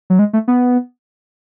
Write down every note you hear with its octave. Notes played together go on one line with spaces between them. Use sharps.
F#3
G#3
A3
B3